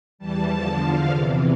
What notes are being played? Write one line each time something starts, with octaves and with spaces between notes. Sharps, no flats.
E2 E3 G3 A5
E2 D3 F3
E2 D3 F3 F5
E2 C3 E3